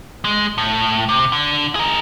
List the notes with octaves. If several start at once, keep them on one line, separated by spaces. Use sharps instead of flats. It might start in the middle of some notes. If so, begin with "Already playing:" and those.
G#3
A2
C3
D3
G#4 A#4